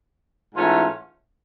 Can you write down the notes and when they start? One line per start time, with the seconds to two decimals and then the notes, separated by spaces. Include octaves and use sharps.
0.55 G#2 E3 A3 C#4 F4